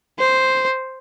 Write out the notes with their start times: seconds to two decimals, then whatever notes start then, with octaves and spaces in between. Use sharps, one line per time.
0.19 C5